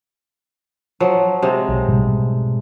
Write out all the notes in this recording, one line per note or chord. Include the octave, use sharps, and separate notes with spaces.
F3 F#3
C3 G#3
B1
G#2 B2 G3